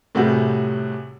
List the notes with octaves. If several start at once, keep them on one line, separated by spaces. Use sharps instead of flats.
A2 C3 G3 F#4 G#4